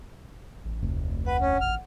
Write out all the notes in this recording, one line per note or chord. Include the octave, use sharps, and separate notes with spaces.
A1
F1 D2
B4 F#5
C#4
A1 F6